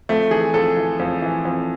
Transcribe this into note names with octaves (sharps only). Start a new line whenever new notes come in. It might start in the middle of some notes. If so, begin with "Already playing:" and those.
F2 A3
E3 G#4
F2 A4
E3
F2
E3
F2